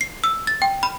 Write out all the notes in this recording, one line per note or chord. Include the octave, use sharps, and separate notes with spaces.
C7
E6
A6
G5
B5